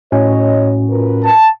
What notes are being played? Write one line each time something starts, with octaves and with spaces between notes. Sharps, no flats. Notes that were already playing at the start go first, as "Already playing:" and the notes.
A2 C#4 F#4 C#5 D#5
F4 A#4 B4
A5